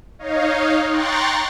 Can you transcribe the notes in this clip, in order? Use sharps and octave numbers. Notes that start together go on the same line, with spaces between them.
D#4 C#5 D#5 F5
G5 A#5 C6 C#6 F#6 A6